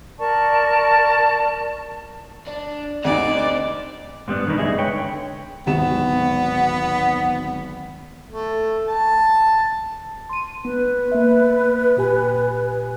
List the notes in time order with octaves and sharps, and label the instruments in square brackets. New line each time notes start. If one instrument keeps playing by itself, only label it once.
[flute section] A#4 D5 A5 C#6
[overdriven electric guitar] D4
[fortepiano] D2 C3 D#4 [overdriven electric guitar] C4 D#5 [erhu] D5
[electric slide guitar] G#2 G3 B3 D4
E2 B2 D#3 G3 D#4 B4
G2 C#3 G#3 G#4 D#5 E5
B4 C#5 G5
D3
[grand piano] D1 G#1 E7 [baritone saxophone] B3
[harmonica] A3
A5
[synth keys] C6 D#7
[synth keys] B3 [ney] B4
[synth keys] A#3 E5
A#2 G4 G#5